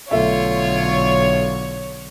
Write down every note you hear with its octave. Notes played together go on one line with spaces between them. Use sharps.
B1 D3 A3 F4 C#5 E5